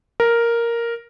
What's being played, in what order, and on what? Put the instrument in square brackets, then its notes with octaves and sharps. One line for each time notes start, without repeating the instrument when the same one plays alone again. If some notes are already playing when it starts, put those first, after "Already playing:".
[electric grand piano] A#4